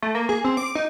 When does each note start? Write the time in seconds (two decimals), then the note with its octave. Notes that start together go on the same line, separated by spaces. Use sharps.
0.02 A3
0.15 A#3
0.29 G#4
0.44 C4
0.57 D6
0.75 D#4